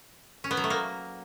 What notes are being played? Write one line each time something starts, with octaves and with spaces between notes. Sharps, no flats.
C#4
B3
F#3
A3
A#3